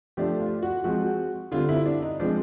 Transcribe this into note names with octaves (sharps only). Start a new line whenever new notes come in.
F3 A3 D4 G4
F4
F#4
F3 G#3 C4 F#4
D3 G3 C4 F4
E4
D4
D#4
F3 G#3 C4 D4